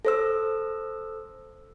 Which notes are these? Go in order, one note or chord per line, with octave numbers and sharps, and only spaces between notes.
A4 C5 E6